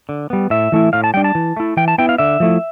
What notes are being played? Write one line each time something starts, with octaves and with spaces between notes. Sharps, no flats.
D3
G3 B3
A2 E5
E3 A3 E4
A2 F5
A5
G3 D4 G5
A5
E3
A3 E4
E3 G5
A5
B3 E4 G5
F5
D3 E5
F3 A3 E4